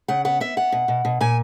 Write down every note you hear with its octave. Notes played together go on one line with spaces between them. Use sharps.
C#3 F#5
B3 F#5
B3 E5
B3 F#5
B2
B2
B2
A#2 G#5